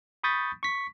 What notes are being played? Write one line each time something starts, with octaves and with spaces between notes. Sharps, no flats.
B5 C#6 D#6 G6 A6 B6
C#6 B6